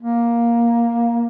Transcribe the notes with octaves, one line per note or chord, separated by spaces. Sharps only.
A#3